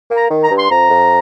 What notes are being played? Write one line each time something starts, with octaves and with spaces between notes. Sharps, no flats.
A#3
A#5
D#3
A#5
G2
C6
F2 A#5
F2